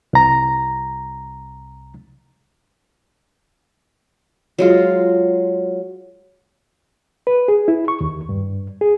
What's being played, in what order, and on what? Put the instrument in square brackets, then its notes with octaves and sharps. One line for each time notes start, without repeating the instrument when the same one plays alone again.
[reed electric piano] C2 A#5
[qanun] F#3 G#3 F4
[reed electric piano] B4
G#4
E4
C#6
D#2
G2
G#4